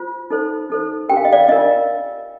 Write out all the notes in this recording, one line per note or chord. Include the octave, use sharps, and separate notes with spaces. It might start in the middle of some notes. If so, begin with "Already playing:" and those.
Already playing: F4 C5
D#4 A4 C5
D#4 A4 C5
D4 G4 A#4 G5
F5
D#5
D5 F5
D5
D4 F4 A#4 D#5